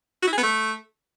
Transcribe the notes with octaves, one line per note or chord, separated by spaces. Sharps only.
F#4
E4
G#4
B3
A3